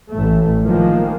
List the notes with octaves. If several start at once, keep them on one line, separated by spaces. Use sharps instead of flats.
A1 A3
D#3 F3 G#3 A#3